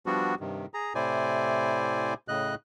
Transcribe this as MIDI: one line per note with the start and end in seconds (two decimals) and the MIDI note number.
0.06 0.35 53
0.06 0.35 55
0.06 0.35 59
0.06 0.35 62
0.06 0.35 66
0.40 0.66 43
0.40 0.66 48
0.40 0.66 51
0.74 0.93 68
0.74 0.93 82
0.95 2.14 45
0.95 2.14 48
0.95 2.14 64
0.95 2.14 72
0.95 2.14 74
0.95 2.14 80
2.28 2.55 45
2.28 2.55 49
2.28 2.55 75
2.28 2.55 90